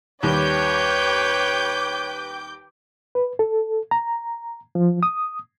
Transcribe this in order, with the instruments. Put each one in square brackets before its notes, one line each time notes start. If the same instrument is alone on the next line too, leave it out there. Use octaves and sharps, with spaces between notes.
[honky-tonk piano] D#2 G3 [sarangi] B4 [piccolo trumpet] C#5 [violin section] G5 D6 G6
[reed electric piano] B4
A4
A#5
F3
D#6